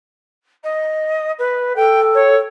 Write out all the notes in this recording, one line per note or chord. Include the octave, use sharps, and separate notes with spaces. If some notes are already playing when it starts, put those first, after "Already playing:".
D#5
B4
A4 G5
C#5